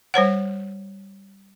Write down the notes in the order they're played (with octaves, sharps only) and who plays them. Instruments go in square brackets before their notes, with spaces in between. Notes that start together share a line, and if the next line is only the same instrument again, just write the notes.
[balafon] G3 C5 C#5 F#5